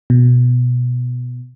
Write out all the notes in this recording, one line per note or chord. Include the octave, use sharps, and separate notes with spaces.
B2